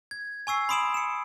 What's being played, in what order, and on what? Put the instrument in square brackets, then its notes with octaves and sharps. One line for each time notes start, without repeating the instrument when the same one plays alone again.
[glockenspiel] G#6
G#5 C#6 E6 C7
B5 C6 D#6 D7 E7 F#7
C#7 E7